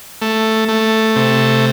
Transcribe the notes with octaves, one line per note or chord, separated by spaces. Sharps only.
A3
A3
C3